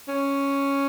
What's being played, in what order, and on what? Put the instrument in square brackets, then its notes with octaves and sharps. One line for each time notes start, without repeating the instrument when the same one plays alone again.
[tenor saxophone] C#4